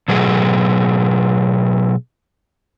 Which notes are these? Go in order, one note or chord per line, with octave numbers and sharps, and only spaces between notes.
B2 F#3 A3 G#4